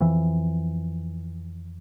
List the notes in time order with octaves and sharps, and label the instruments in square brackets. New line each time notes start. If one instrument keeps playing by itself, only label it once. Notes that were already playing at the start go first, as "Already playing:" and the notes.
[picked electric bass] F2 E3